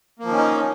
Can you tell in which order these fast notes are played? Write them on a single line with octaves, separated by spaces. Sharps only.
A#3 F3 D#3 C#4 D#4